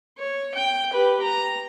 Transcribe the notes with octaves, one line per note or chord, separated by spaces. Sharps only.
C#5
G5
G4 B4
A#5